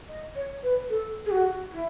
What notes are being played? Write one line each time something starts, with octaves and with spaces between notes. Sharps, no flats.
D#5
C#5
B4
A4
G#4
F#4
E4